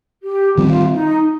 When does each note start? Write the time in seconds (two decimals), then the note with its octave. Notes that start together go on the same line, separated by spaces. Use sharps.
0.23 G4
0.58 D#3 G3 C4 F4
0.92 D#4